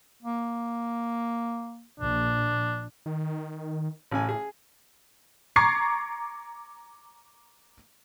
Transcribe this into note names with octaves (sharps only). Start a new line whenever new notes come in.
A#3
A#1 D4
D#3
A1 A2 C#3 G#5
G#4
A#5 C#6 D6 G#6 A6 C7